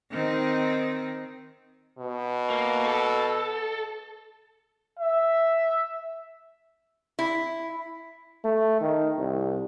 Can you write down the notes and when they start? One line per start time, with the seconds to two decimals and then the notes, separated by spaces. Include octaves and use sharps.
0.11 D#3 C4 D#4
1.98 B2
2.50 A#3
2.86 A4
4.99 E5
7.19 E4
8.44 A3
8.81 D#3
9.18 C2